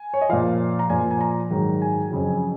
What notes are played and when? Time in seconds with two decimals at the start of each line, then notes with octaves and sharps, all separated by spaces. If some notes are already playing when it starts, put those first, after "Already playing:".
Already playing: G#5
0.14 C#5
0.21 D#5
0.29 A#2 F3 F5
0.79 A#5
0.90 A#2 F3 G#5
1.11 G#5
1.21 A#5
1.51 G#2 D#3 F#3
1.82 G#5
2.11 F2 C#3 F#3